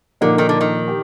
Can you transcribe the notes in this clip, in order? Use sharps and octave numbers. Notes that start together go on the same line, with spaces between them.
A#2 D3 F3 A#3 D#4
D#3
D3
D#3
G4